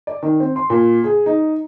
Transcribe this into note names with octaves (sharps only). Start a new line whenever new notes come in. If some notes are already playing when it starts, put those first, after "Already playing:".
D5
D#3
C4
C6
A#2
G#4
D#4